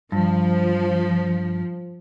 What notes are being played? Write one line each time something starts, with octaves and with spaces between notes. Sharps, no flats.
G2 F3